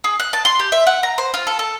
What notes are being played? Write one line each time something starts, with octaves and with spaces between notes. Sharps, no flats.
G#4
F#6
A5
C6
G4
E5
F#5
A#5
C5
F4
A4
A4